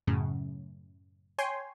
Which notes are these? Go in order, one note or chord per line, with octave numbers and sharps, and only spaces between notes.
F#2 A2 C#3
C#5 G5 G#5 C6